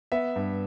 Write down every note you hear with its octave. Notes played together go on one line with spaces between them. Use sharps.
B3 E5
G2